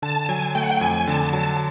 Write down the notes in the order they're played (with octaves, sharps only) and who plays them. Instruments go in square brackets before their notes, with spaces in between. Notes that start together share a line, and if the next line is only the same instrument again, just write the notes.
[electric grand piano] D3 [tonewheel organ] A5
[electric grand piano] F#3 [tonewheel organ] G#5
[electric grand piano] A3 [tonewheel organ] G5
[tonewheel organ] F#5
G5
[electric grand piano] F2 [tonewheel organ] G#5
[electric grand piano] D3 [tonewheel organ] A5
[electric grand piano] F#3 [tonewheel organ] A5